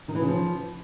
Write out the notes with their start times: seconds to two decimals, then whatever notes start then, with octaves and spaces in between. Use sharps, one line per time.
0.08 D#3
0.15 E3
0.21 C#3
0.28 F3